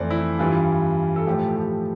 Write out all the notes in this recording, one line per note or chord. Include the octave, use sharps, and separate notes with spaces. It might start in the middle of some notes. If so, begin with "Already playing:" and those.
Already playing: F2 E3 A3 C5 D5
E4
G2 E3 G3 F4
A4
A2 F3 A3 G4
A4
G4